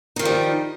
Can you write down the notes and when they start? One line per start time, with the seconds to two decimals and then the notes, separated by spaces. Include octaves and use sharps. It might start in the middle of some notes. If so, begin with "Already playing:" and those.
0.16 D#4
0.19 D#3
0.22 F3
0.25 G3